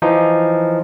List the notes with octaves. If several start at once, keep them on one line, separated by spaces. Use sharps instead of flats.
E3 F3 D#4